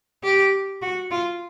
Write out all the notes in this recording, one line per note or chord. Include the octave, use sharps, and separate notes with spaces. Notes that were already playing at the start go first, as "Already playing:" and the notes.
G4
F#4
F4